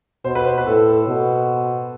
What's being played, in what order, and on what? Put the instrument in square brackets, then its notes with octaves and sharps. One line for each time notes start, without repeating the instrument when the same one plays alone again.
[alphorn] B2 [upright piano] C5
[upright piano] B4
C5
B4
[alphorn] A2 [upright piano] A4
[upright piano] A4
[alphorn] B2